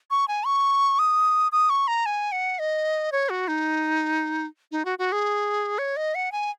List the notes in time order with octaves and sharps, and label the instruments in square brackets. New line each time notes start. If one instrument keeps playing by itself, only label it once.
[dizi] C#6
G#5
C#6
D#6
D#6
C#6
A#5
G#5
F#5
D#5
C#5
F#4
D#4
D#4
F#4
F#4
G#4
C#5
D#5
F#5
G#5